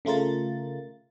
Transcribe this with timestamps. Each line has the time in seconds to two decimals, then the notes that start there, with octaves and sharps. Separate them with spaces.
0.05 C#3 A3 F4 A#4 A6